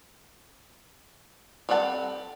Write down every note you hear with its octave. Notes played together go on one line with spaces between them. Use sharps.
G3 C4 A4 F#5 A5